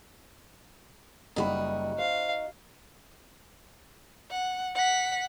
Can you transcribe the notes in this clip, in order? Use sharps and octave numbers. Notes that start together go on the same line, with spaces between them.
F#1 G3 D#4 F#4 B5
C5 F5
F#5
F#5 B6